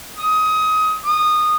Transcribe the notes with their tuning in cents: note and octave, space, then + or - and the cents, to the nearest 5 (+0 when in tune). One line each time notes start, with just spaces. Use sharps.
D#6 +20
D#6 -20